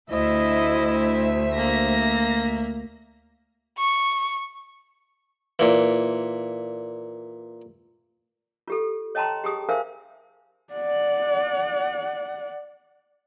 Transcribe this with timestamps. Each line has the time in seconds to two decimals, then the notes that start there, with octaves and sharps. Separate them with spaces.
0.11 D2 E4 C5 D#5 E5
1.57 A#3 A#6
3.78 C#6
5.59 A#2 E3
8.68 F4 G4 A4
9.15 C#5 D#5 G5 A5 A#5 C6
9.44 G4 G#4 D#6
9.69 A#4 C5 E5 F5 G#5
10.73 D5 F#5